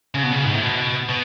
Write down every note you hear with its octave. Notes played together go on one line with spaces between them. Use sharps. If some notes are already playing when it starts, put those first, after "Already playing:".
C#3
B2
C#3
G#2
A2
B2
B2